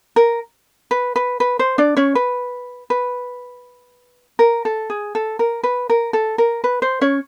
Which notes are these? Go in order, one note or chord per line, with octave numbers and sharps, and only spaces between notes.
A#4
B4
B4
B4
C5
D4 D5
C#4 C#5
B4
B4
A#4
A4
G#4
A4
A#4
B4
A#4
A4
A#4
B4
C5
C#4 C#5